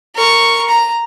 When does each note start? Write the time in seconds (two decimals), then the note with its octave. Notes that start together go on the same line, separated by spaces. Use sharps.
0.15 A#4 C#6
0.69 A#5